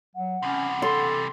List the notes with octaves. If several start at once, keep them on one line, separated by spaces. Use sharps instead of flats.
F#3 F#5
C3 E3 C#4
A4 C6